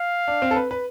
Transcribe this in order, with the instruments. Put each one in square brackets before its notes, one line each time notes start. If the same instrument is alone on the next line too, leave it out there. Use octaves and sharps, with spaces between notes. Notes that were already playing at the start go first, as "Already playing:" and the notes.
Already playing: [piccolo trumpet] F5
[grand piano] D4
C4
A4
B4
B4